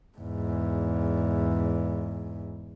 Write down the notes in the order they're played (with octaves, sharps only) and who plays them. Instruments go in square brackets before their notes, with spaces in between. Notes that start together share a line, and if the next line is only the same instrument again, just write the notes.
[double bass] E2 G#2